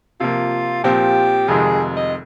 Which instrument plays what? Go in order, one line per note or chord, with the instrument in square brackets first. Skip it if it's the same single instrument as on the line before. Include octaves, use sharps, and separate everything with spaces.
[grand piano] C3 F3 A#3 [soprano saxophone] F4
[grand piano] A#2 F3 C4 [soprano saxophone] G4
[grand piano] F1 F2 C3 D#3 G#3 [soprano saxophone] G#4
[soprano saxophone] D#5